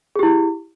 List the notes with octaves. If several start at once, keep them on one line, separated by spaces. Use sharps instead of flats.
E4 G4 G#4